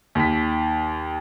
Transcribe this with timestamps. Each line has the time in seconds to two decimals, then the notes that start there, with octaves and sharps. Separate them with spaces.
0.15 D#2 B6